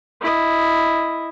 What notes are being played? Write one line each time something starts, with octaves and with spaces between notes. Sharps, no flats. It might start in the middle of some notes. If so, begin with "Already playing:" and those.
E4 D#5